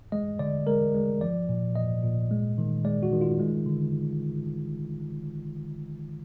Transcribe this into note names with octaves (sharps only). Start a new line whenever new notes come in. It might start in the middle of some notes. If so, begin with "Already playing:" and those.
G#3 D#5
D3 D5
G#3 A#4
G#3
F3 D5
A#2
A#2 D#5
A#2
G#3
D#3
G#3 D5
F#4
D#3
F4
G#3
D3